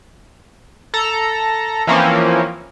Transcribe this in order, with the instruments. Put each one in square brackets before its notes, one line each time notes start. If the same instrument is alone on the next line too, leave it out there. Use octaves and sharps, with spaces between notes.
[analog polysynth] A4 A#5
E3 F3 A#3 C4 C#4